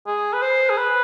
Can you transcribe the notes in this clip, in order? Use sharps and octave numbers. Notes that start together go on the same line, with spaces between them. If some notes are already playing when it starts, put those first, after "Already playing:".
G#4
B4
C5
G#4
B4